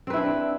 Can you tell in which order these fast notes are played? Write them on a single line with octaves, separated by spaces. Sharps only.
C4 B4 E4 D4